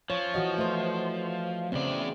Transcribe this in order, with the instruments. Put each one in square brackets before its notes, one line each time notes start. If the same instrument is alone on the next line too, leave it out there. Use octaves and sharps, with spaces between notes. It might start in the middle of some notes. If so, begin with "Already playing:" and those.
[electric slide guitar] F3 [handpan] C#5
[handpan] E3 F#4 D#5
A3 C5
[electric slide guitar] E2 D5 [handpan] C#3 C4